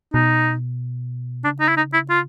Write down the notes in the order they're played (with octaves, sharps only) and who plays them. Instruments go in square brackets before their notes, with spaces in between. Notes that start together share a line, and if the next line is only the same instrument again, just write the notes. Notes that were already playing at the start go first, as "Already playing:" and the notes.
[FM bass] B2 [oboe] D#4
[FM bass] C#3 [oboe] D4
[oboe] D#4
E4
D#4
E4
F4